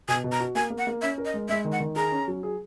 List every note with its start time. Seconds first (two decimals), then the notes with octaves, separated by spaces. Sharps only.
0.08 B2 G#5
0.24 B2
0.32 A#5
0.40 F#4
0.55 A#3 G#5
0.70 A#3
0.78 F#5
0.87 A#3
1.02 C#4 E5
1.18 A#4
1.25 D#5
1.34 G#3
1.49 G#3 E5
1.65 D#3
1.72 F#5
1.80 D#3
1.96 G#4 A#5
2.12 C#4
2.28 F#3
2.43 G#4